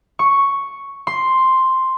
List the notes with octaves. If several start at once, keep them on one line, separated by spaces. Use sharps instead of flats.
C#6
C6